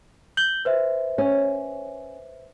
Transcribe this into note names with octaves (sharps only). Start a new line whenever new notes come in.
G6 F#7 G7
B4 C5 E5
C#4